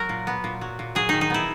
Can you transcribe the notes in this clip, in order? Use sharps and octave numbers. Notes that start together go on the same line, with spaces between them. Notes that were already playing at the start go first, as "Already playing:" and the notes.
Already playing: F#3 A#4
A#2
B3
A#2
F#3
A#2
F#3 G#4
D#3 D#4
D#4
B3 E4